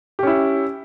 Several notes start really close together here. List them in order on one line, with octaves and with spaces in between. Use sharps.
G4 C#4 E4